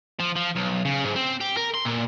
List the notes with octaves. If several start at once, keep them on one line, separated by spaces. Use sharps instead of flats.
F3
F3
B1
C#3
G#2
C4
G4
A#4
C6
A#2